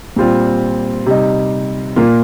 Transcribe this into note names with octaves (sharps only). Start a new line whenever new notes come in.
A#2 G3 C4 F4
C3 G3 D#4
A#2 A#3 F4